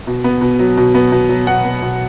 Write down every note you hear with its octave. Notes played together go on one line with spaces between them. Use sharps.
B2
B3
B2
F#3
B2
B3
B2
F#3
B2 F#5
B3
B2